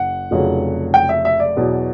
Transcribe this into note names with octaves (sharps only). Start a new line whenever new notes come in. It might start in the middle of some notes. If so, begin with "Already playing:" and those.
Already playing: F#1 F#5
F1 F2 C#3 F#3
G5
E5
E5
D5
E2 B2 F#3